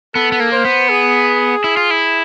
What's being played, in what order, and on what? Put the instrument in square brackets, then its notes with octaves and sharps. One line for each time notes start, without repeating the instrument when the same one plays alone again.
[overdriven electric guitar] B3 [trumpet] A4
[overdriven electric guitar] B3
A#3
[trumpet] C5
[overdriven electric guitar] B3
[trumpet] G#4
[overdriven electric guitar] E4
F4
E4